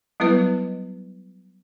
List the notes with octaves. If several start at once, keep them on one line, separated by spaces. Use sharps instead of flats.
F#3 G3 B3 E4 B4 D#5